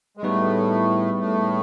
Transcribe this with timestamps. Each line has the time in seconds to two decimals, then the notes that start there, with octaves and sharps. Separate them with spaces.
0.17 G#3
0.23 A2 G3 A3 B3 D#4 G#4 B4
1.19 A2 A3